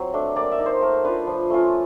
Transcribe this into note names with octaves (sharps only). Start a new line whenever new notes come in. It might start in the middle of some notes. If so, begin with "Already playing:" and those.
Already playing: F#3 C4
A3 D4
A#3 D5
E5
D#4
C5
A3 A#4
D4 F4 B4
F3
A3 C#4 F4